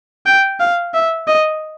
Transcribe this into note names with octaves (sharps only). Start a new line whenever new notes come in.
G5
F5
E5
D#5